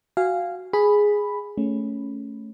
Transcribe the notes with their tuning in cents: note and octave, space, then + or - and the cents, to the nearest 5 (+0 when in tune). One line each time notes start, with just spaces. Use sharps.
F#4 +0 F5 -10 G#5 -15
G#4 +0 B5 +0
A3 +0 C#4 +0